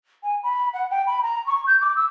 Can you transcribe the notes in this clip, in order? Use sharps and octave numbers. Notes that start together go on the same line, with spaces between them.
G#5
B5
F#5
G5
B5
A#5
C#6
G6
D6
E6